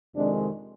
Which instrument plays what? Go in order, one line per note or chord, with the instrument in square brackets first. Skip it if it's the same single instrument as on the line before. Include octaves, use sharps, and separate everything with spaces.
[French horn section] F2 C3 D#3 G#3 D4